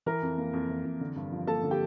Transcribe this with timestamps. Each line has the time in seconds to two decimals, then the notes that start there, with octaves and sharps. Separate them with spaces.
0.06 E3 A#4 A#5
0.22 F2
0.38 A#3
0.53 F2
0.69 E3
0.85 F2
1.00 D3
1.16 G2
1.32 F3
1.47 A#3 A4 A5
1.63 D3
1.71 G4 G5